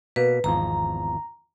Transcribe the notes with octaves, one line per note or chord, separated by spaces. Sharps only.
B2 A#3 B4
G#1 E2 F3 A#5